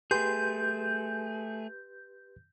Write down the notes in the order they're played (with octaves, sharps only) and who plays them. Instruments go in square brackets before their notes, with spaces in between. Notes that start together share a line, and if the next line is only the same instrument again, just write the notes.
[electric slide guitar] A3 G#4 [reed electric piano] G4 B4 C6 [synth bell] G6